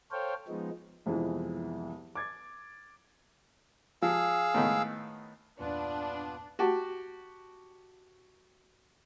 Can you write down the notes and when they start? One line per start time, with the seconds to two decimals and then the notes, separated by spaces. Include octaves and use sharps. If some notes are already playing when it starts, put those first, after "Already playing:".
0.11 A4 C5 C#5 F5 G5
0.48 F3 G#3 B3 D#4
1.06 C2 F2 E3 G#3 B3
2.15 D6 G#6 A6
4.02 F3 G#4 F5 E6
4.55 A2 D#3 B3
5.59 E2 G2 A#2 B3 D4 F4 B4 D5
6.59 F#4 G4 A5